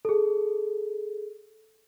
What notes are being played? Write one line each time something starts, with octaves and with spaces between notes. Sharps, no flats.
G#4 A4